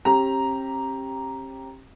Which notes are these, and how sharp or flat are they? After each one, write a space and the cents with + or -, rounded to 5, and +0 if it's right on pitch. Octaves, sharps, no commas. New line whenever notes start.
C4 +45 G4 +0 A#5 +0